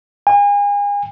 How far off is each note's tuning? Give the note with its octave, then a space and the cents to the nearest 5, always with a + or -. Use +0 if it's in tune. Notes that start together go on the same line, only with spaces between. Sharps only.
G#5 -35